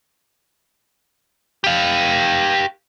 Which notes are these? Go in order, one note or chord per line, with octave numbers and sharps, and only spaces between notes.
G4 F5